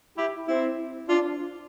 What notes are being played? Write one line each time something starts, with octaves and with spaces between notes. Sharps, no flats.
E4 G4
C4 E4
D4 F4